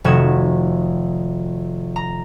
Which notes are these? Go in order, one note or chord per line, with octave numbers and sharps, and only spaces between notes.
F1 D#3 F#4 G#6 E7
A#5